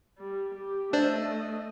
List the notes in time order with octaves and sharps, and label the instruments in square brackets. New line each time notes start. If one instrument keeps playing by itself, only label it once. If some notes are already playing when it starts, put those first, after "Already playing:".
[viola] G3
G4
[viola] A3 D#5 [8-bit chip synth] D4 C5 D5